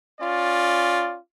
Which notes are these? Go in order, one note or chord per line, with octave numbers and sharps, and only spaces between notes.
C#4 F4 D5